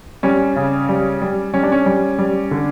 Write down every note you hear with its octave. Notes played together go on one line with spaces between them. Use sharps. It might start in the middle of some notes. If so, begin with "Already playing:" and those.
G3 C#4
C#3
G3
G3
G3 C#4
D4
C#4
G3
G3
D3